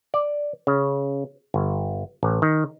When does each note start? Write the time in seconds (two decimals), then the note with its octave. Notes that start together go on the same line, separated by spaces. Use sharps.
0.14 D5
0.67 C#3
1.54 G1
2.23 A1
2.42 D#3